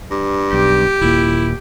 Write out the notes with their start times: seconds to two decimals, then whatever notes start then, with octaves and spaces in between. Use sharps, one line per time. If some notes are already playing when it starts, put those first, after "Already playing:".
0.11 G2
0.53 B1 G4
1.01 D#1 A#2 E4